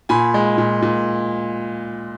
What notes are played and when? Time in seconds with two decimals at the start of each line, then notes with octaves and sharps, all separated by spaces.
0.09 A#2 G#5 B5
0.34 G#3
0.58 A#2
0.82 A#2